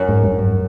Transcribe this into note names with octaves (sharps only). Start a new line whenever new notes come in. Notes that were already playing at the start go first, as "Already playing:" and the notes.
Already playing: F#2
G#2
G2
G2